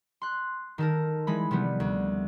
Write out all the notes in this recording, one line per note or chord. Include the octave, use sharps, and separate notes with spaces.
C6 F#6
D#3 A4 A#4
E3 G#3 B5
C3 F3 G3 B3
D2